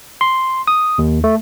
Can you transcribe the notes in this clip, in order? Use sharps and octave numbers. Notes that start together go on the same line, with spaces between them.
C6
D#6
D#2
A3